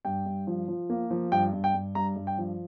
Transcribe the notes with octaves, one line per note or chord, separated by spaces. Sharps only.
G2 G5
G2
F3
F3
A#3
F3
G2 G5
G2
G5
G2
G2 A#5
G2
G5
F3